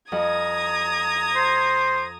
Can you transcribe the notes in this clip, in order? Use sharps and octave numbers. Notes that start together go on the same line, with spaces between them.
F2 A#5 D#6 G#6
C5